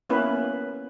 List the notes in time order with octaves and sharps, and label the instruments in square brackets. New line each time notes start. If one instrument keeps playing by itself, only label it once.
[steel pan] A#3 B3 C#4 E4 B4